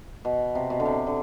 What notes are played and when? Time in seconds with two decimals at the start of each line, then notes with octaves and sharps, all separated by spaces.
0.25 B2
0.55 C3
0.70 B2
0.80 D3
0.86 C3
1.07 D3